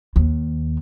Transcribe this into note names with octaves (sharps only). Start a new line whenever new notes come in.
D#2